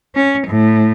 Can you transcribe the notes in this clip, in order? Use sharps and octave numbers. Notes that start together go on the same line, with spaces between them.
C#4
A2